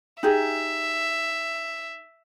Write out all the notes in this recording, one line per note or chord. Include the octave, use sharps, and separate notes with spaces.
D#4 G4 G#4 E5